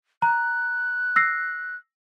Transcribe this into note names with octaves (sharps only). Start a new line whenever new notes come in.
A#5 F#6
E6 A#6 C7